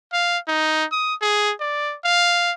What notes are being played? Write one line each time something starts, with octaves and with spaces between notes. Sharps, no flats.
F5
D#4
D#6
G#4
D5
F5